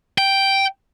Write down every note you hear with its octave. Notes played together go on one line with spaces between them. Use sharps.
G5